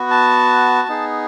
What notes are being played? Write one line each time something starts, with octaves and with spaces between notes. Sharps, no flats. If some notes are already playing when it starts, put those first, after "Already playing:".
Already playing: B3 F#4
A5
B3 D#4 G#4